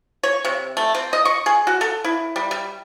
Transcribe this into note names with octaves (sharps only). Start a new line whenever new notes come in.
C#5
C3
A3
C4
D#5
C#6
G#4
F#4
A4
E4
G3
G3